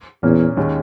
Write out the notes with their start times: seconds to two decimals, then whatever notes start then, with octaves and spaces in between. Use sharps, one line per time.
0.23 E2 A#2 A#3 C#4
0.57 D#2 D#3 G#3 C#4